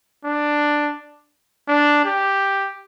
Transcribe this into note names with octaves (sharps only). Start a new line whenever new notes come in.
D4
D4
G4